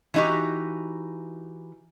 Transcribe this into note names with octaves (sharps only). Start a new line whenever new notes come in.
E3 G3 D#4 F#4 G4